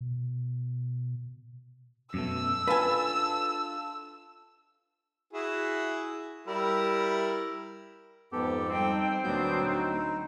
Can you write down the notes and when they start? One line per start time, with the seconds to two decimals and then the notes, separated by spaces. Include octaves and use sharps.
0.01 B2
2.14 F#2 B2 A3 E6
2.68 D4 F4 A4 B4 G#5
5.33 E4 F#4 G#4
6.48 G3 E4 A#4
8.33 F2 G#2 B3 G4 A4
8.69 G3 C4 D#4 G5
9.24 D2 A#2 F#3 B3 D4 G6
9.67 D2 D#4